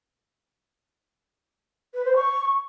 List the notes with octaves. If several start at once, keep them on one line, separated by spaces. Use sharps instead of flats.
B4
C5
C#6